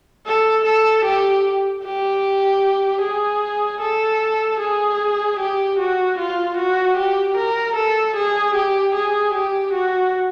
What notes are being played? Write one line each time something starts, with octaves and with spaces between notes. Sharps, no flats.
A4
A4
G4
G4
G#4
A4
G#4
G4
F#4
F4
F#4
G4
A#4
A4
G#4
G4
G#4
G4
F#4